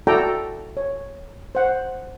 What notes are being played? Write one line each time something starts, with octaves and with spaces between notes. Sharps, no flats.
E4 F#4 A4 D5 G5 A#5
C#5
C5 F#5